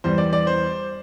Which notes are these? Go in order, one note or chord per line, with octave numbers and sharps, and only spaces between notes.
E2 E3 G3 C5
D5
D5
C5